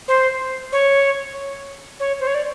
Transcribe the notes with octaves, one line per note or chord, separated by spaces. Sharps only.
C5
C#5
C#5
C5
C#5
D5